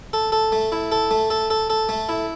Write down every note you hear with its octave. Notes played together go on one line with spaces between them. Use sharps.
A4
A4
A3
E4
A4
A3
A4
A4
A4
A3
E4